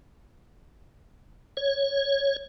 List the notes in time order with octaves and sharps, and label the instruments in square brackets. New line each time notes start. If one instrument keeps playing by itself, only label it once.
[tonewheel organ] C#5